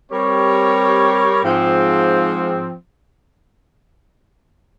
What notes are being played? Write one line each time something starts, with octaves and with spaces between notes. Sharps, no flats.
G3 C4 G4 A#4 C#5
G#2 F3 C4